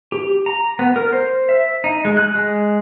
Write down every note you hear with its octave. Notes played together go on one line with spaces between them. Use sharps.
G4
A#5
B3
A#4
C5
E5
D#4
G#3
F#6
G#3